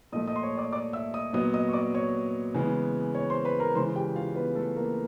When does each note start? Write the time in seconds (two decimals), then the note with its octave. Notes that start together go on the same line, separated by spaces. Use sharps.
0.12 A#2 F3 A3 D#5 D#6
0.27 D#5 D#6
0.36 C6
0.43 C#5 C#6
0.57 D5 D6
0.73 D5 D6
0.93 E5 E6
1.14 D#5 D#6
1.33 A#2 F#3 B3 D#5 D#6
1.53 D#5 D#6
1.68 C#6
1.73 D5 D6
1.95 C#5 C#6
2.54 C#3 E3 G#3 B3
3.15 C#5 C#6
3.30 C5 C6
3.45 B4 B5
3.60 A#4 A#5
3.75 C#3 E3 G#3 C5 C6
3.96 G4 G5
4.16 F4 F5
4.36 B3 B4
4.56 A3 A4
4.76 A#3 A#4